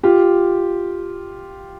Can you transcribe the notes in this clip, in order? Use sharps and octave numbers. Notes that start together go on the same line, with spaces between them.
F4 G4